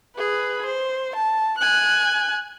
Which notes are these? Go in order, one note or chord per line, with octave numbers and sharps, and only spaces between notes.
G#4 B4
C5
A5
G#5 F#6